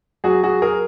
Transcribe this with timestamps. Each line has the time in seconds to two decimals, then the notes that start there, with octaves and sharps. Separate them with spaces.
0.24 F#3 F#4 G#4
0.43 F#4 G#4
0.62 G#4 A#4